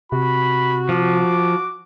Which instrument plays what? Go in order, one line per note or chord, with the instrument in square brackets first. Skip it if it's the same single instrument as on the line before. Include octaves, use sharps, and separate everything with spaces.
[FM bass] C3 [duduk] F#4 [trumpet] B5
[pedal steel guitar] F3 [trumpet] D6